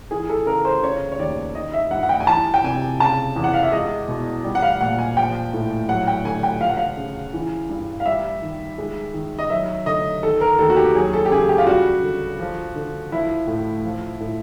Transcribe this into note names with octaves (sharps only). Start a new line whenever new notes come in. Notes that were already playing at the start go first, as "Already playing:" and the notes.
E3 G#4
A4
C#3 A#4
C5
C#3 C#5
C#5
D#2 D5
D#3 D#5
E5
G2 F#5
F#5
G5
G#5
E3 A5
G5
C3 G#5
C#3 A5
E2
F#5
F5
E5
G#3 D#5
B2
G3
F#5
F5
A#2 F#5
G#5
F3 G5
A2
F#3 F#5
G5
D3 G#5
G5
F3 F5
F#5
F5
C#3
E3
G2
F5
G3 E5
D#3
G#3
D#3
D#5
F#3 E5
D3 D#5
D#3 A4
A#4
D#2 A4
F#4
G4
F#3 G#4
A4
G4
C#3 G#4
G4
F4
G3 F#4
D3
F3
D3
F3 E4
A2
F3
A2